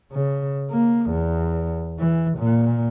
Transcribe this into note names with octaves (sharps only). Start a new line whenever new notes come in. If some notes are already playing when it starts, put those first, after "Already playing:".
C#3
A#3
E2
E3
A#2